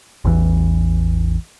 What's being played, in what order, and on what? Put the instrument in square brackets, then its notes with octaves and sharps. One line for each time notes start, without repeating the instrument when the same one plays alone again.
[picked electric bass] A1 E2 E3